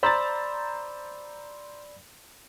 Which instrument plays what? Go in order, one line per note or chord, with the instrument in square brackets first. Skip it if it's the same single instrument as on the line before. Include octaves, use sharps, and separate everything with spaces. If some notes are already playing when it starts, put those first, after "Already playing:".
[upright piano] C5 A#5 A6 [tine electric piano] D5 B5 E6